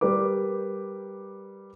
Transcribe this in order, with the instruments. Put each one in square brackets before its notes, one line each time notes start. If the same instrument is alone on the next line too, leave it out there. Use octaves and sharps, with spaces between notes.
[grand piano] G3 G4 A#4 B4 D6